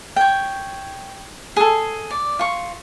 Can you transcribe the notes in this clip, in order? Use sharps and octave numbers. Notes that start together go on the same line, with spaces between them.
C#5 G5
G#4 A4
D5
F4 C#6